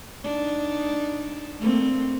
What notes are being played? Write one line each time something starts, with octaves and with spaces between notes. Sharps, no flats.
D4 D#4
A3 A#3 C4